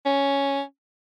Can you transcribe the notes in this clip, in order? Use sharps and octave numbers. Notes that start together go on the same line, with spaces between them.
C#4